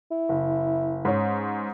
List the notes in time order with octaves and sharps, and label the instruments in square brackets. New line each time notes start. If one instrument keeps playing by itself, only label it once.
[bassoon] E4
[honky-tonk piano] F#1
G#2 C#4